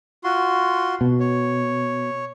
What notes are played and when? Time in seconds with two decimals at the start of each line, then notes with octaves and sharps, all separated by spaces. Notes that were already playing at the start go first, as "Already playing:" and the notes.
0.24 F4 F#4 C6
1.01 B2
1.20 C#5